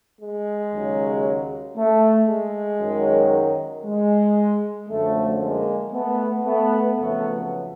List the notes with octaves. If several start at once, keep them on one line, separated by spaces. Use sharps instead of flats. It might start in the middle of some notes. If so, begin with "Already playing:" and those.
G#3
D#2 C#3 F#3
A3
G#3
F#2 D#3 F#3
G#3
F#2 D3 F3 A3
G#3 A#3
A3 B3
A3 B3
F2 C#3 F#3 A3 B3